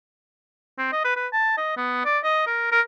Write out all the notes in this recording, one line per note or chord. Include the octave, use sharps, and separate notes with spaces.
C4
D#5
B4
B4
A5
D#5
B3
D5
D#5
A#4
A#4